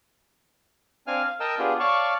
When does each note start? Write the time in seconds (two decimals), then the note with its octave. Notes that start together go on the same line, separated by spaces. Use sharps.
1.07 C4 D4 F5 G#5 F6
1.24 F5
1.40 A#4 D#5 G5 A5 E6
1.59 B3 D4 F4 G4 G#4
1.80 C#5 D5 F5 A5 C#6